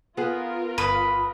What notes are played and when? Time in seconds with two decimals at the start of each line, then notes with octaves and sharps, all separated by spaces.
0.17 B3 F4 G#4 A#4
0.78 G1 B4 D#6